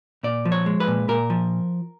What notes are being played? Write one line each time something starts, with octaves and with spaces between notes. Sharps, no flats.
A#2 D5
F3
C#5
G#3
B4
A#2
A#2 A#4
F3